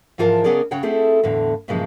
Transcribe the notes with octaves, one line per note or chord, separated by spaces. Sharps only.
G#2 E3 F3 F4 A#4 A5
C#3 B3 C#4 G#4 A#4 D5
C#3 C#5 F#5 G5
A3 C4 E4 G#4 A4
E2 A2 D3 F5
G2 A#2 C#3 E3 F3 G#3